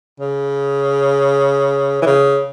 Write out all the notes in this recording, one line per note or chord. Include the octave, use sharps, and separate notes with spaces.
C#3
E3
C#3